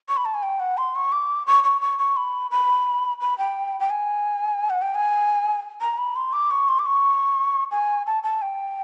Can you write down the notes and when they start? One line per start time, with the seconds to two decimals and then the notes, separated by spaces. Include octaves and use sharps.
0.09 C#6
0.17 B5
0.25 A5
0.34 G#5
0.43 G5
0.60 F#5
0.77 C6
0.95 C#6
1.12 D6
1.47 C#6
1.64 C#6
1.81 C#6
1.99 C#6
2.16 B5
2.51 B5
3.21 B5
3.38 G5
3.80 G5
3.90 G#5
4.70 F#5
4.82 G5
4.95 G#5
5.81 A#5
5.98 B5
6.16 C6
6.33 D6
6.51 C#6
6.68 C6
6.79 D6
6.86 C#6
7.71 G#5
8.07 A5
8.23 A5
8.42 G5